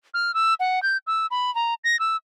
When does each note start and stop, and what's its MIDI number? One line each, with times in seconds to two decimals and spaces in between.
0.14 0.34 89
0.34 0.54 88
0.60 0.82 78
0.82 0.97 91
1.07 1.26 88
1.31 1.53 83
1.55 1.74 82
1.84 1.99 94
1.99 2.16 88